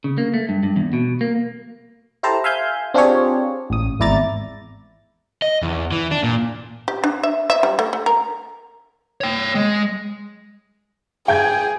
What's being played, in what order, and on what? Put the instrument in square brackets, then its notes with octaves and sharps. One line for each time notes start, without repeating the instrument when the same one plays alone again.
[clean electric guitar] C#3
A#3
A3
G2
G2
E2
B2
A#3
[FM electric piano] E4 G4 A4 C5 A5 A#5
E5 F5 G#5 G6
C4 D4 F4 G4 G#4 C#5
A1 D#6
G#1 E2 E4 D5 A#5 A6
[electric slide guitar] D#5
E2
E3
D4
A#2
[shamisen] G4
D4
E5
E5
G3
A3
A3
A#4
[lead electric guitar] C#5 G5
G#3
[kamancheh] G#4 [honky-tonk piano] G5 G6 G#6